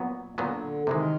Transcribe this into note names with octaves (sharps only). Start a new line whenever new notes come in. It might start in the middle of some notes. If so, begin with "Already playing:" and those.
Already playing: A#2 F#3 B3
A#2 D3 F#3 B3
C3 D#3 E3 G#3